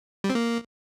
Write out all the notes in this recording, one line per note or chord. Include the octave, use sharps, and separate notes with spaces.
G3
C4
A#3